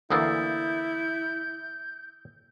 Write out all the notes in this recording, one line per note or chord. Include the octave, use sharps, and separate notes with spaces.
D2 E3 A#3 E4 D#6 E6 G6 A6